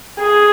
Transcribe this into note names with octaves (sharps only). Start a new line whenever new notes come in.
G#4